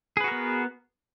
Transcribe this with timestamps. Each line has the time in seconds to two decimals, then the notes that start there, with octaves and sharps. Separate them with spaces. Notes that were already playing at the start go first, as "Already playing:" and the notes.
0.17 G#4
0.20 B4
0.24 F#4
0.28 A#4
0.31 B3